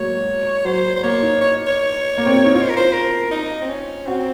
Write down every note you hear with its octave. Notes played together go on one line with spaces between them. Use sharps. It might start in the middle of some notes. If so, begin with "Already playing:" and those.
Already playing: F#3 G#3 A#3 C#5
F#3 C5
C5
A#3 C#5
D#4
C#5
C#5
A#3
C4
C#4
D#4
F4 C#5
C5
A#4
C5
A#4
D#4
C4
C#4
C4 F#4